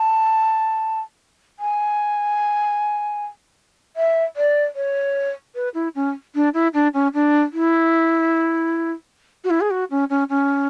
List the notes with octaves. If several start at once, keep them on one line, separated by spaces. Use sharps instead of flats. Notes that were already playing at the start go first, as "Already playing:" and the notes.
Already playing: A5
G#5
E5
D5
C#5
B4
E4
C#4
D4
E4
D4
C#4
D4
E4
F#4
E4
G#4
F#4
C#4
C#4
C#4